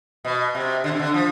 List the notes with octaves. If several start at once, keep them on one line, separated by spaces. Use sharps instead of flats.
B2
C3
D3
C3
D3
F3